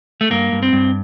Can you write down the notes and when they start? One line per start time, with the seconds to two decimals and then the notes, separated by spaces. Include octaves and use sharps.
0.21 A3
0.31 G2 A#3
0.52 G2
0.63 C4
0.73 G2